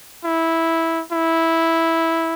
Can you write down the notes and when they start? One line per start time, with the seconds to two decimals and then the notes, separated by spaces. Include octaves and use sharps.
0.25 E4
1.12 E4